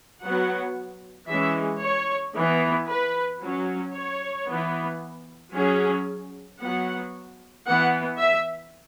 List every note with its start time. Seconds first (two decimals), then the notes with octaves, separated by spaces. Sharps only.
0.22 F#3 B3 F#5
1.28 E3 G#3 C#4 E5
1.82 C#5
2.35 E3 B3
2.88 B4
3.41 F#3 C#4
3.94 C#5
4.48 E3 B3
5.54 F#3 C#4 G#4
6.59 F#3 B3 F#5
7.66 E3 B3 F#5
8.19 E5